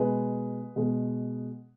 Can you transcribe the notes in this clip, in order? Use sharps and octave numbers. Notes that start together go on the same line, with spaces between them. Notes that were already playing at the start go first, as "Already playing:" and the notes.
Already playing: B2 G#3 G#4 B4
B2 G#3